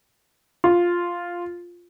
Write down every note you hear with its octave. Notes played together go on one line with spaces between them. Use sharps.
F4